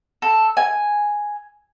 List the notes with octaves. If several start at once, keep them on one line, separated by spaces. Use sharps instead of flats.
A4
G#5